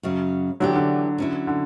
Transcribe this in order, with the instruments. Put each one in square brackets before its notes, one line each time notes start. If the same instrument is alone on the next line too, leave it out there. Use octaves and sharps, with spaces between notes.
[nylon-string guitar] F#2 C#3 F#3
[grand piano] D3 F#3 [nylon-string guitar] E3 B3 D4 G4
[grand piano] D3
[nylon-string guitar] F#3 C#4 E4
[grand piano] D3